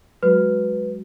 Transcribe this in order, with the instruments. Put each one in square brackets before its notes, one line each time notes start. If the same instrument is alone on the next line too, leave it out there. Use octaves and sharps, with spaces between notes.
[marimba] F#3 G#3 F#4 [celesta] B4